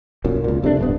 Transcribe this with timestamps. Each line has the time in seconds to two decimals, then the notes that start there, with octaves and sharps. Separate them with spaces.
0.24 B1 F#2 A#2
0.44 C#2 A#2
0.62 F1 C3 A3 D4
0.79 D1 G2 B3